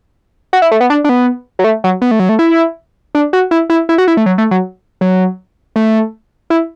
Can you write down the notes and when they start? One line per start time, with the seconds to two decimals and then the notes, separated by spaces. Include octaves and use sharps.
0.53 F#4
0.62 E4
0.71 A3
0.80 B3
0.90 D4
1.04 D4
1.09 B3
1.59 F#3
1.64 A3
1.84 F#3
2.02 B3
2.11 A3
2.19 F#3
2.29 A3
2.39 E4
3.15 D4
3.33 F#4
3.51 E4
3.70 E4
3.89 E4
3.98 F#4
4.08 E4
4.17 A3
4.26 F#3
4.38 A3
4.51 F#3
5.01 F#3
5.76 A3
6.50 E4